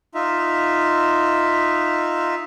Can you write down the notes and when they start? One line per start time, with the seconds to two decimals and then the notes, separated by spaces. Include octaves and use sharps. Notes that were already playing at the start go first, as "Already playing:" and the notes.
0.15 D#4 F4 E5